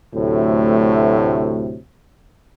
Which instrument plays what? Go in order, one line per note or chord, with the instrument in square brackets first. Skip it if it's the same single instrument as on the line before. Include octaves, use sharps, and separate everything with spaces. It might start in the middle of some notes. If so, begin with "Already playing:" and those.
[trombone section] D2 A2 C3 F#3 A3